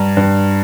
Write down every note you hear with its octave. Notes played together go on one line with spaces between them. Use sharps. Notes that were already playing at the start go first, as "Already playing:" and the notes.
Already playing: G2 A#5
G2